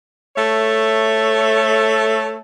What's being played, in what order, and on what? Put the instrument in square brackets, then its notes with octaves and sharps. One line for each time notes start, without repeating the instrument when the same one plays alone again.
[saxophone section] A3 A4 C#5 E5